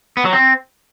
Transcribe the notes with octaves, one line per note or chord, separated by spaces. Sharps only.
B3
F#3
C4